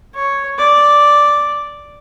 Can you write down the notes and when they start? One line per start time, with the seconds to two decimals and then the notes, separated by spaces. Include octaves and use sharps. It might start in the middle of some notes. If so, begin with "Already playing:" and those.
0.15 C#5
0.59 D5